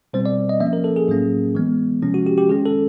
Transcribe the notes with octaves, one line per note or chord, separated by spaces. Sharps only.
B2 G3 C4 C5
D5
D#5
F3 A#3 C#4 E5
A#4
A4
G#4
A2 F#3 A#3 C#4
E3 G#3 B3
C3 F3 G#3 C#4
F#4
G4
G4
D#3 G#3 C#4 G#4
A4